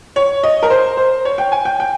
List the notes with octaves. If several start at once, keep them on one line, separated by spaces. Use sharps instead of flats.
C#5
D#5
A#4
C5
C5
C#5
G5
G#5
G5
G5